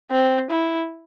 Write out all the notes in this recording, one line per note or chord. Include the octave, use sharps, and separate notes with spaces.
C4
E4